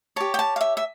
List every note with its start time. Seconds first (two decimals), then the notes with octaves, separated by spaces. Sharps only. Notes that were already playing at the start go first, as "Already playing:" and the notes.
0.16 G4 C#5 A5
0.34 G5
0.39 A5
0.56 F5
0.61 E5
0.77 E5